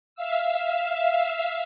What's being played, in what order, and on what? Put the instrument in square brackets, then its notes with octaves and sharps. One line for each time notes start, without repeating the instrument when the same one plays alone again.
[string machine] E5 F5 E6